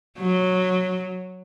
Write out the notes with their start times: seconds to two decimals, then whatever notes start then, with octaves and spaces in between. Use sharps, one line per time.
0.18 F#3